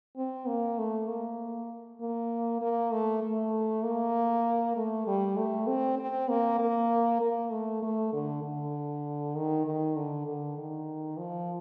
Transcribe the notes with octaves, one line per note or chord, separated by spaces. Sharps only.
C4
A#3
A3
A#3
A#3
A#3
A3
A3
A#3
A3
G3
A3
C4
C4
A#3
A#3
A#3
A3
A3
D3
D3
D#3
D#3
D3
D3
D#3
F3